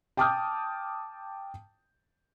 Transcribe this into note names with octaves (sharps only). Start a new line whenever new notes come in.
G5 A5 D6 D#6 F6 G6